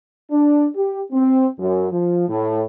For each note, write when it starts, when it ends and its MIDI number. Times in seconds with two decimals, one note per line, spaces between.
0.31 0.66 62
0.75 1.00 67
1.12 1.47 60
1.59 1.88 42
1.90 2.25 53
2.29 2.61 45